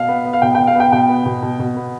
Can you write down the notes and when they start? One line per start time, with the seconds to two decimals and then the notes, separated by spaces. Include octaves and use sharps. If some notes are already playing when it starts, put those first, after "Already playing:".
Already playing: B2 F5
0.08 B3
0.25 B3
0.33 F5
0.42 B2 G5
0.55 G5
0.59 B2
0.67 F5
0.75 B3 G5
0.92 B2 G5
1.09 B3
1.25 B2
1.42 B2
1.59 B2
1.76 B3